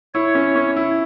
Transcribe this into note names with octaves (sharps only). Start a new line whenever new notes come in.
E4 C#5
C#4
C#4
E4